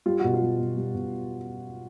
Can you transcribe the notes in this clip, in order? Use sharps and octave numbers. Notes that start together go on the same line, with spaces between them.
G3 F4
B2 F#4
F4
G3
B2
G3
B2